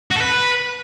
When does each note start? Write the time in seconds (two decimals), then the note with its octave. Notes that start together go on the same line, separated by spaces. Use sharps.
0.11 F#4
0.16 A4
0.21 B4